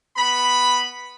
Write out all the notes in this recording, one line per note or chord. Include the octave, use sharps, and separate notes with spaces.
B3 B5